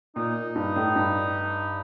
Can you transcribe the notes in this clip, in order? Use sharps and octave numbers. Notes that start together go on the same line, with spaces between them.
A#2 D#4
G2
A2
G2